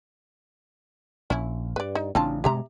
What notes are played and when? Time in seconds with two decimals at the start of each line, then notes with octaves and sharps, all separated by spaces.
1.30 A#1 C#4 E4
1.76 G2 B4 D5
1.95 D#4
2.15 A1 C#3 C4 D4 F4 A5
2.44 G2 B2 G#3 G4 E5 A#5